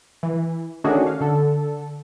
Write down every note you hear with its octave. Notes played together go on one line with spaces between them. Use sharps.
E3
D#3 A3 C#4 D4 F#4 G#4
F5
D3 A4